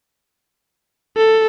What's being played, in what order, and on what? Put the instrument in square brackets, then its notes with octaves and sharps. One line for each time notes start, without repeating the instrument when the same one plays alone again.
[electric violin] A4